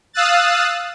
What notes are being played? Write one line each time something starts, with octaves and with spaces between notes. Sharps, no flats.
F5 D#6 E6 F#6 A6